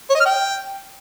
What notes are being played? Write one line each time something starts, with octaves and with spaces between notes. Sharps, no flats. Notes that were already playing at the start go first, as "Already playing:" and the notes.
C#5
D#5
F6
G5